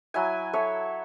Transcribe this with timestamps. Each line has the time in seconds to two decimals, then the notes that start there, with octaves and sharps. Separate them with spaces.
0.14 F#3 E4 G#5
0.53 A4 C#5 E5